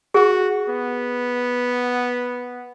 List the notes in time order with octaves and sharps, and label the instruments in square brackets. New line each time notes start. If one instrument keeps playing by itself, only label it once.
[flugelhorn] F#4 [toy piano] G#4
[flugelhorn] B3